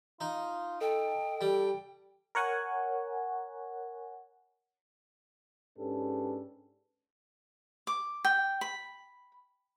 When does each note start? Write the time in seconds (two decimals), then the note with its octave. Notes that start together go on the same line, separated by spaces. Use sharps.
0.21 D#4 F4
0.81 A4 D#5 G5
1.41 G3
2.35 A#4 C#5 F#5 G#5
5.79 G#2 C#4 D4 G4 A4 B4
7.87 D6
8.24 G5
8.61 B5